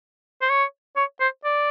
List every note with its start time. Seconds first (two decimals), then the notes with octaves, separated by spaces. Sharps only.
0.41 C5
0.50 C#5
0.97 C#5
1.20 C5
1.45 D5